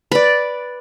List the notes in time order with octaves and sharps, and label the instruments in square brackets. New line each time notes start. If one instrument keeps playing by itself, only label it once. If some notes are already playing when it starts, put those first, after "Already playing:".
[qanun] B4 D5